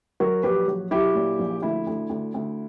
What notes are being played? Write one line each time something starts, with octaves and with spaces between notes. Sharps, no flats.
F#3 F#4 A#4
A#1 G4 B4
F#3
F#3 E4 G4
A#2
A#1
D2 E4
D2
D2
D2